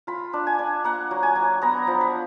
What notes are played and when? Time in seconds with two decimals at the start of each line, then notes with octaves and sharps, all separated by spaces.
0.07 F4 B5
0.33 D4
0.47 G#5
0.59 D4
0.84 A#3 F#5
1.11 F#3
1.23 G#5
1.36 F#3
1.62 B3 A#5
1.87 F3
2.01 B5